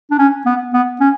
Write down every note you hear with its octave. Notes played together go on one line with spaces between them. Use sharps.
D4
C#4
B3
B3
C#4